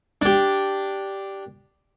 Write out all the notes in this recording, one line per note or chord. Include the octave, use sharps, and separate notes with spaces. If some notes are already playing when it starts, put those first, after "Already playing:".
D4 G4